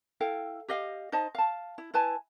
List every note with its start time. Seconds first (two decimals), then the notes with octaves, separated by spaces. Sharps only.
0.20 E4 A4 F5 G5
0.68 G4 D#5 F5
1.12 D#4 C5 D#5 A5
1.35 F5 A5
1.78 E4
1.94 E4 B4 G#5 A5